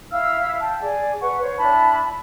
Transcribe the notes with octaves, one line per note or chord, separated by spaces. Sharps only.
E4 F5 E6 F6
G5 A5
G#4 D5
B4 F#5 C#6
C5 C#5
D4 E4 A5 B5